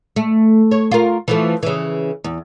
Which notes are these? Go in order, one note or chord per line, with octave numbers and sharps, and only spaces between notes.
A3
C#5
F4 A#4
E3 F3 A3
C#3 E3
E2